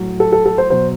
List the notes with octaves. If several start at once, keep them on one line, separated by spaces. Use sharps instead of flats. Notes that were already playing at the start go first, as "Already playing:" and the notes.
Already playing: A2 F#3
A4
A4
A4
C5
B2 F#3 C5